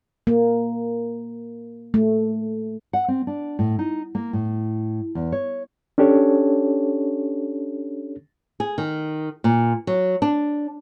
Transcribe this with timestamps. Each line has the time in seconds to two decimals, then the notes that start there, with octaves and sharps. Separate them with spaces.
0.27 A#3
1.94 A3
2.93 F#5
3.08 C4
3.27 D4
3.59 A2
3.79 D#4
4.15 A#3
4.33 A2
5.15 E2
5.32 C#5
5.98 C#4 D4 G4 A4 C#5
8.60 G#4
8.78 D#3
9.44 A#2
9.87 F#3
10.22 D4